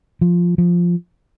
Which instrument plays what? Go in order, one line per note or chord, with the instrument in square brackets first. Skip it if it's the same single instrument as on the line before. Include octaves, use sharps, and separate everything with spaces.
[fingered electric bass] F3
F3